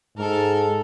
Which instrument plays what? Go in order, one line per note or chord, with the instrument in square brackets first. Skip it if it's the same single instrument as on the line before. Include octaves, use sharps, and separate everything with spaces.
[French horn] G#2 [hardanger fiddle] A4 A#4